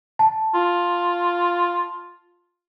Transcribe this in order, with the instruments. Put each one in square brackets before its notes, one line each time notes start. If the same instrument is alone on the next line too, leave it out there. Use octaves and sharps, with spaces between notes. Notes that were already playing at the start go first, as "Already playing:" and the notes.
[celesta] A5
[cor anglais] F4